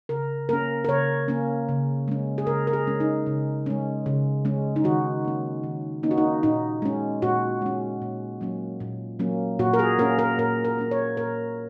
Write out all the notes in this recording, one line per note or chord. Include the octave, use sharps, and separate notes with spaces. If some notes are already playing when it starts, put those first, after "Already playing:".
C#3 A#4
A#3 C#4 A#4
A#4
C#3 C#5
A#3 C#4
C#3
G#3 C#4
G#4
C#3 A#4
A#4
G#4
G#3 C#4
D#4
C#3
G#3 C#4
C#3
G#3 C#4
D#4
D#3 F#4
A#3 C#4
D#3
A#3 C#4 D#4
F#4
D#4
A#2 D#4
G#3 C#4
A#2 F#4
G#3 C#4
A#2
F#3 A#3 C#4
A#2
F#3 A#3 C#4
A#2 F#4
A#4
G#4
A#3 C#4 A#4
A#4
A#2 A#4
A#4
A#3 C#4
C#5
A#2 A#4